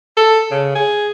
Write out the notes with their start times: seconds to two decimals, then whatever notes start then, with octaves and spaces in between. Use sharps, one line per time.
0.17 A4
0.51 C#3
0.75 G#4